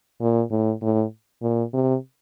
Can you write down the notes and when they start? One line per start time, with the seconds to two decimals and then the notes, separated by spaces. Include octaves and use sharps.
0.20 A#2
0.51 A2
0.82 A2
1.42 A#2
1.73 C3